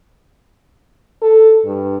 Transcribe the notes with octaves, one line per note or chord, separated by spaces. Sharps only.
A4
G2